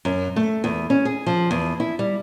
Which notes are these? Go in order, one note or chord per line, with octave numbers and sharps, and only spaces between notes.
F#2
A3
E2
C#4
G#4
F3
E2
E4
G3